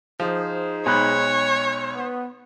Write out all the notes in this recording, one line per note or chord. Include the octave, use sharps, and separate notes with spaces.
F3 D#4 G#4 C5
B1 G#3 C#5 B5 F#6
B3